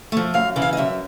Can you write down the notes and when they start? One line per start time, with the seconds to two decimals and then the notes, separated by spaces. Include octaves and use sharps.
0.12 F3 A3
0.34 F#2 F5
0.56 C#3 E3
0.62 F5
0.73 D#5
0.77 F#2 E5